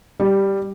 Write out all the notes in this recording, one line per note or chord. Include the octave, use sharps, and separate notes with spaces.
G3